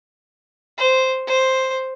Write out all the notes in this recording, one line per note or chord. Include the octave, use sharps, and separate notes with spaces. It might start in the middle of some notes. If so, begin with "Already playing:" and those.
C5
C5